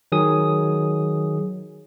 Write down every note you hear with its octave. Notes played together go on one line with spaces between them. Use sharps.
D#3 F#3 G#4 D#6